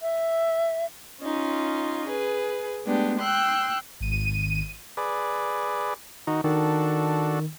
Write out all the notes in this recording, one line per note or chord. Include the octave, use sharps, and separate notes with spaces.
E5
C#4 D#4 F4
G#4 B4
G#3 A3 B3 D4 G4
G5 C6 E6 F#6
G#1 D#7
G#4 B4 D5
D#3 D#4 F#4
D#3 D4 F#4 A4